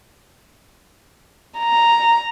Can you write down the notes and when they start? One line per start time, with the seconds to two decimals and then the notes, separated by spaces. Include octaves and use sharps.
1.59 A#5